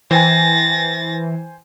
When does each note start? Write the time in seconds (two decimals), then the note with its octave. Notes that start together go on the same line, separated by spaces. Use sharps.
0.11 E3 C5 G5 G#5 A6 A#6